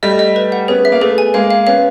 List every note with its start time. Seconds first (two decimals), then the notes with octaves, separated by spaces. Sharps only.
0.03 G3 A3 D#5
0.19 D#5
0.36 B4
0.52 F#5
0.68 B3 C#4 G#4
0.85 E5
0.92 A#3
1.01 A3 B3 G#4
1.18 G#5
1.34 G#3 A#3 F5
1.51 F5
1.67 B3 C#4 F5